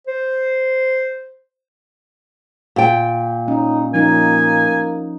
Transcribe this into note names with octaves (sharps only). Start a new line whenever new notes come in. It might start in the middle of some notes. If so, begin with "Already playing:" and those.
C5
A#2 G5
C#4 D#4
F3 A#3 C#4 D#4 G#5